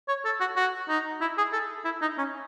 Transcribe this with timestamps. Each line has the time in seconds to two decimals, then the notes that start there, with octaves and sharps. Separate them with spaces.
0.08 C#5
0.25 A4
0.40 F#4
0.56 F#4
0.89 D#4
1.21 E4
1.38 G#4
1.53 A4
1.85 E4
2.01 D#4
2.18 C#4